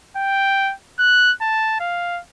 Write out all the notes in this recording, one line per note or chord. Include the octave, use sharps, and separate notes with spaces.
G5
F#6
A5
F5